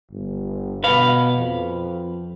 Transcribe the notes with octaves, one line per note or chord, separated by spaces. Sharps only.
G1
B2 B4 F5
F2